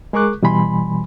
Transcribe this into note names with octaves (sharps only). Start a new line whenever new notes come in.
G#3 G#4 A#4 C#6 D6 F#6
B2 E3 G3 G#5 B5 C6